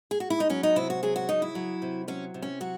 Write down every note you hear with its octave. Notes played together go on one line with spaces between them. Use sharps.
G#4
F#4
E4
D#4
F#3 C#4
D#4
C3 E4
F#4
F#3 G#4
F#4
C#3 D#4
E4
F#3
C3
F#3 C#4
C3
C#4
F#3 F#4